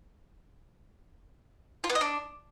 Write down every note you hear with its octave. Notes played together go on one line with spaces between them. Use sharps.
F4
B3
D#5
D4